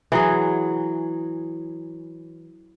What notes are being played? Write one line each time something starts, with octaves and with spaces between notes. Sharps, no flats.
E3 F#3 G#4